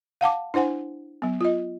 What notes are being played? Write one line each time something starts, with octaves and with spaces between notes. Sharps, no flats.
F5 F#5 A5 D6
D4 E4 C5 F#5 G#5
F#3 B3
F4 D#5